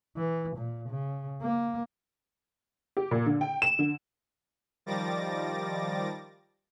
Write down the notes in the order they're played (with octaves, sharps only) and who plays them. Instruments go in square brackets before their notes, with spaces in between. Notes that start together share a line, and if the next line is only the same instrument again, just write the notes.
[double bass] E3
A#2
C#3
A#3
[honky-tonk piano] G4
A#2
D3
G5
E7
D3
[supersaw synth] D#3 F3 G3 D6 A6 A#6